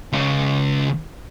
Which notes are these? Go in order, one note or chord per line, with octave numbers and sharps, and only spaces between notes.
C#2 C#3